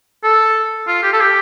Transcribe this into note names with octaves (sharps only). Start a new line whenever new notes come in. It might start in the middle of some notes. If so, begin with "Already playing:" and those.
A4
F4
G4
A4
G4